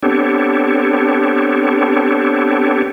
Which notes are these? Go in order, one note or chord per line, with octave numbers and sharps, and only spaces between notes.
B3 C4 D4 G4 A4 C#5